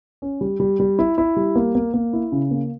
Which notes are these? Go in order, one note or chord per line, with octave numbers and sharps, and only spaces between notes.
C#4
G3
G3
G3
E4
E4
G3
A#3
A#3
A#3
E4
C#3
A#3